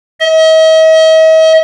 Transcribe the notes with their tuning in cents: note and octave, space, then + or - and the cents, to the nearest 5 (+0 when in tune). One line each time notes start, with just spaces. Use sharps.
D#5 +45